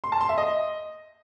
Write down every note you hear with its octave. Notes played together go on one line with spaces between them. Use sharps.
C6
A5
C6
E5
D#5